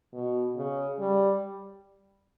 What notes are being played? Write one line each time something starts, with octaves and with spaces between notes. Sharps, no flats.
B2
C#3
G3